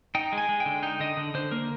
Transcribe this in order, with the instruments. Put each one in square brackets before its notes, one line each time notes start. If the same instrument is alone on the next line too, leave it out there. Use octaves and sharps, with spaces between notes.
[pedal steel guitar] D#4 G5
G#3
G#5
G#3
G5
D3
D#4 G5
D3 D#5
D3
D3 C5
A#3 A#4